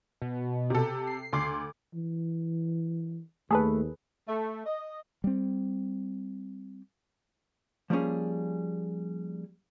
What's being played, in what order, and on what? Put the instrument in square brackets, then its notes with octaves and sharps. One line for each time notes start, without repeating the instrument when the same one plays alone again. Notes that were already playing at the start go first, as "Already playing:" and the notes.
[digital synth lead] B2
[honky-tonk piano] C3 A4
[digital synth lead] C7
[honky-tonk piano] D2 C6 D6
[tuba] E3
[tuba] D#2 [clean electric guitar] A3 [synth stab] G#4 A4 B4
[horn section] A3
D#5
[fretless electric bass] G3 C4
[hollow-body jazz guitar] F3 G3 A#3 C#4 G#4